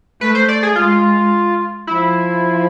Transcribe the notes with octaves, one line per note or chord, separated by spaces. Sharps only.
A3 B4
C5
D5
G#4
G#3 F4
F3 E4